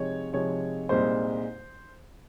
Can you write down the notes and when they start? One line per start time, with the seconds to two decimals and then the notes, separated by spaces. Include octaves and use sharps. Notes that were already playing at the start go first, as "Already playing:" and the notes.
Already playing: C3 F3 G#3 D#4 C#5
0.33 C3 F3 G#3 D#4 C#5
0.89 C2 A#2 G#3 D#4 C5